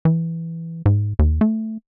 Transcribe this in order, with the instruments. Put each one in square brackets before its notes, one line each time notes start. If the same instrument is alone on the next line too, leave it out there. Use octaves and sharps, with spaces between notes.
[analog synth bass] E3
G#2
D#2
A3